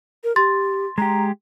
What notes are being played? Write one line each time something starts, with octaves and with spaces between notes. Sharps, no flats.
A#4
G4 C6 A6
G#3 G4 A#5